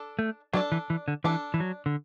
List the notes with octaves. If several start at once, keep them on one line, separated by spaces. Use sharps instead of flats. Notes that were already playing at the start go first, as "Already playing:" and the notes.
Already playing: D4 A4 D5
A3
F#3 D4 A4 D5
E3
E3
D3
E3 D4 A4 D5
E3
F#3
D3